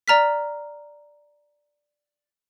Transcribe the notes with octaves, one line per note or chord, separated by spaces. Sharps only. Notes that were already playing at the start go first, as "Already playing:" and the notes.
D5 A#5 F6 B6